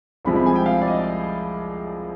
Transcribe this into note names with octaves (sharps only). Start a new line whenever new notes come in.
C2 C3 F3 G#3 B5
B5
G#5
G5
F5
D5
D#5